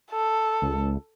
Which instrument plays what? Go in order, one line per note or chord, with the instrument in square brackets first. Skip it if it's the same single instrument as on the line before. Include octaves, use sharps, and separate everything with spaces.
[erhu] A4
[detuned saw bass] C#2